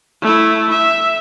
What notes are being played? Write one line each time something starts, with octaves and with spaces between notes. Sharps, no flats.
A3 E4
E5